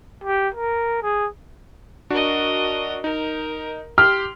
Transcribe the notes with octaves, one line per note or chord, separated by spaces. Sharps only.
G4
A#4
G#4
D4 F#4 A#4 D#5
D#4 A#4
G4 C6 F6